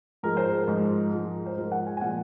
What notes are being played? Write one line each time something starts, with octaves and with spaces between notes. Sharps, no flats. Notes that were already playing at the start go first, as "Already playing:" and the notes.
G#2 F3 G#3 A#4
C5
A#4
G#2 F3 G#3
G#2 F3 G#3
C5
G#2 F3 G#3 A#4
F#5
G#5
G#5
A#2 F3 G#3 F#5